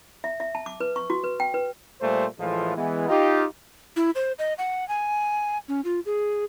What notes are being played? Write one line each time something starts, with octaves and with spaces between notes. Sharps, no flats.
E5
E5
A5
D6
B4
C#6
F#4
B4
G5
B4
A#2 G3 A3 C5
A2 E3 F3 G#3 A3 F4
E3 G#3 B3
D#4 F4 G4
E4
C5
D#5
F#5
G#5
C#4
F4
G#4